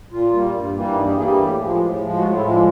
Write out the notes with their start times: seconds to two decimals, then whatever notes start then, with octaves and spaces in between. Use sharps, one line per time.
0.12 A#2 F4
0.34 G3 A#3
0.54 G2
0.75 E3 G3 A#3
0.96 G2 D#4
1.07 G4
1.17 E3 G3 A#3 G#4
1.27 G4
1.38 A2
1.59 F3 G#3
1.80 A2
2.02 F3 G#3
2.17 F#4
2.23 A2 F4
2.37 E4
2.43 F3 G#3
2.51 D4